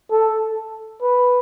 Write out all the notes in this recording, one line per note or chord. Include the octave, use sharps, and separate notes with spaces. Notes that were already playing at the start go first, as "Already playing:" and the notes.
A4
B4